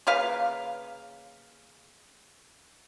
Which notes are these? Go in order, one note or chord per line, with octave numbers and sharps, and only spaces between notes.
C#3 A#3 B4 F5